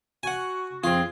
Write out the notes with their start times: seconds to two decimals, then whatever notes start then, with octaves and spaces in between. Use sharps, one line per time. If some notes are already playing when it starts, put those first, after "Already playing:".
0.23 F#4 F#5 G#5
0.84 F2 C4 F4 G#4